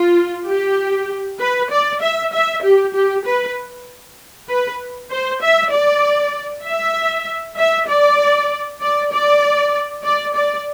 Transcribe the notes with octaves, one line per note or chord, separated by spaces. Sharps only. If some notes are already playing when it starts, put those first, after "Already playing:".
Already playing: F4
G4
B4
D5
E5
E5
G4
G4
B4
B4
C5
E5
D5
E5
E5
D5
D5
D5
D5
D5